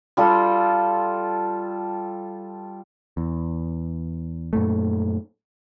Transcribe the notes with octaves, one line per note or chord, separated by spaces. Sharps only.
G3 F4 A4
E2
F#2 A#2 A3